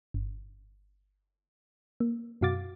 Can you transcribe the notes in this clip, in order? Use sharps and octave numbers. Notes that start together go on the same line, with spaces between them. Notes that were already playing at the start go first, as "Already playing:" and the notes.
G1
A#3
F#2 B2 F#4 F5 D6 A6